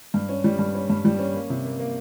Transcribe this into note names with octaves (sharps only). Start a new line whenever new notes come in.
G2
C#4
G3
G2
C#4
G2
G3
C#4
A#3
C3
A#3
A#3